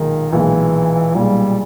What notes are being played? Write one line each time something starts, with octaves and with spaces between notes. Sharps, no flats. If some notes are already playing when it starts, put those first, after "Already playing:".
Already playing: B1 A#2 D#3 G#3
B1 A#2 E3 G#3
B1 A#2 G3 G#3